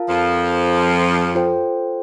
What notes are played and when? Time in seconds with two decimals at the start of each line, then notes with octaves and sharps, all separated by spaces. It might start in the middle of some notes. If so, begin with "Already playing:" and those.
Already playing: F4 A#4 F5 A5
0.09 F2 F3
1.35 F4 A4 C5 G5